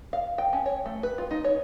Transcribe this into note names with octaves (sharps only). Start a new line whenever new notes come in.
F5
G5
C#4
C#5
A3
B4
F4
D#4
C#5